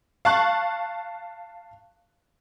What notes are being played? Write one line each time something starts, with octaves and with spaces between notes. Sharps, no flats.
F5 A5 C#6 F#6